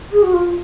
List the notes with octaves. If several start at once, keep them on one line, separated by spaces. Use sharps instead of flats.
G#4
F#4
F4